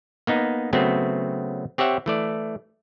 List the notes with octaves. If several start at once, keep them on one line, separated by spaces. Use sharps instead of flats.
A#3 B3 D#4
C#3 F#3 A3 B3 C4 F#4
C4 G4 C#5 E5 F#5
E3 A3 D5